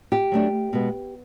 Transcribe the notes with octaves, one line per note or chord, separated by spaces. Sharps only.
G4
F#3 A3 D4
B2 G#3 B3